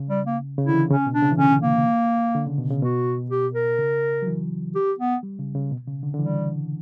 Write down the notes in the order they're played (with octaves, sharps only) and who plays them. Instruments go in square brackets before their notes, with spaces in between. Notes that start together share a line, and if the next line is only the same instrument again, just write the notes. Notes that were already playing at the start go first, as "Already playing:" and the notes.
Already playing: [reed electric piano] C#3
[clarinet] G3
A#3
[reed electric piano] C#3
[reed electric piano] D3 [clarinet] E4
[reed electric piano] E3
[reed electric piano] C#3 [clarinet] C#4
[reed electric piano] B2
[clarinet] D4
[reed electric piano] C#3
E3
[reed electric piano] D3 [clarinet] C#4
[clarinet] A#3
[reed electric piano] D3
C#3
B2
C#3
[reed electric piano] B2 [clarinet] F#4
[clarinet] G4
A#4
[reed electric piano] C#3
F#3
E3
[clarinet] G4
B3
[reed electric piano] G3
C#3
C#3
B2
C#3
D3
D3
[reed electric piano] E3 [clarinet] G3